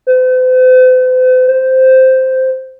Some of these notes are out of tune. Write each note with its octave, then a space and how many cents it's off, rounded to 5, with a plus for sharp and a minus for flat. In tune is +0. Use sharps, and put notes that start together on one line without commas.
C5 -45
C5 -5